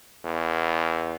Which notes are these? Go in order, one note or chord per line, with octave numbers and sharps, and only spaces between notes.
E2